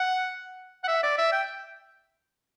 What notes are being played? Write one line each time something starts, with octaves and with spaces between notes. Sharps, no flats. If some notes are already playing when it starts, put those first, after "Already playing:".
Already playing: F#5
F#5
E5
D5
E5
G5